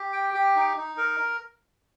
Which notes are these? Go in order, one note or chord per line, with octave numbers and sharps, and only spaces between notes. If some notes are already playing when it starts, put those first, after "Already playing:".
Already playing: G4
G5
G4
D#4
D#4
A#4